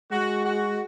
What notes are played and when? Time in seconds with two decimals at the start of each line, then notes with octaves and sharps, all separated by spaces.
0.11 G#3 F#4
0.45 F#4